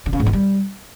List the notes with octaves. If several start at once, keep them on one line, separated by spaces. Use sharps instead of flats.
D3
C#3
G#2
D3
G3